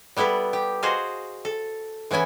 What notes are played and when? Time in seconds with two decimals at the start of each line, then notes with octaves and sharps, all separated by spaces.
0.16 G3 B3 E4 A4 B4
0.53 G4
0.83 F#4 G#4 C5 D#5 F5
1.45 A4
2.11 E3 B3 C#4 E4 G#5